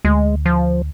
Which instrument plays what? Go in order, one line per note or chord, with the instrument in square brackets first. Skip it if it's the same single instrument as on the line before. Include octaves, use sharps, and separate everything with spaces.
[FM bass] D2 [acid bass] G#3
[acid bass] F3